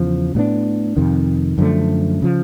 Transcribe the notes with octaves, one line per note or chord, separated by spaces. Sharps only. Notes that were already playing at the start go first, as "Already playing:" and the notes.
Already playing: E2 C#3 F3
A2 F#3 B3 D4
F2 C3 D#3
F#2 D3 F3 A3
C#3 F3